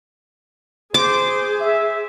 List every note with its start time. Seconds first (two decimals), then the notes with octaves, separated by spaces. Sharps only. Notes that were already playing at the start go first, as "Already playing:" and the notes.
0.94 G#4 C5 D6
1.60 E5